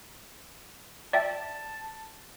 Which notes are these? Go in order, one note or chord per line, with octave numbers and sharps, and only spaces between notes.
D5 E5 G5 A5